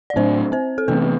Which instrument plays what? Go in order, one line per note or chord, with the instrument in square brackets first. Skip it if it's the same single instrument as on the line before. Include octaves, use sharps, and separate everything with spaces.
[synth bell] D5
[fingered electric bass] A2 F#3 A3 D4 [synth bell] C4 C5
[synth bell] C4 C5
A4
[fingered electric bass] C3 E3 A3 C4 [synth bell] B3 B4